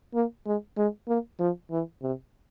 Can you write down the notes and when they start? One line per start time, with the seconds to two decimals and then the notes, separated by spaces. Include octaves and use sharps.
0.14 A#3
0.46 G#3
0.77 G#3
1.08 A#3
1.40 F3
1.71 E3
2.02 C3